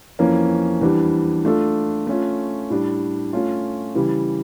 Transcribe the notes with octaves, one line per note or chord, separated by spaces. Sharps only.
F2 E3 A#3 C#4
E2 E3 G3 D4
A3 D4 F4 A4
A3 C#4 F4
A2 G3 D4
A3 C#4 F4
C#3 E3 G3